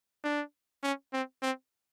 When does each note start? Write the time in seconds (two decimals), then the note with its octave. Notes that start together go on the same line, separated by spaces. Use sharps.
0.24 D4
0.83 C#4
1.13 C4
1.42 C4